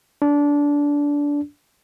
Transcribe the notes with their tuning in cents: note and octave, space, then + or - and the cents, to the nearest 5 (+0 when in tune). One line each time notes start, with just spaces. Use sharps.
D4 -20